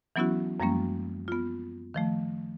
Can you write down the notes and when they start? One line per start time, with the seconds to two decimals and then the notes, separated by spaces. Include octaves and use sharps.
0.16 E3 F#3 B3 C#4 E4 F#4
0.60 F#2 F3 G3 G#3 A#3 C#4
1.28 B3 F4
1.94 D#3 F3 A3